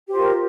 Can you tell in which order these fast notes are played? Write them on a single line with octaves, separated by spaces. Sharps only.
G4 C5 F4 A#4